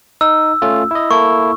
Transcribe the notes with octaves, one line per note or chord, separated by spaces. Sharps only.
D#4 E6
A3 C#4 F4
E4 D#5
A#3 E4 A4 C#6